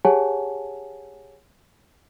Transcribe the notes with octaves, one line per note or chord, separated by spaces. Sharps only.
G4 G#4 C#5 F#5 G#5 A5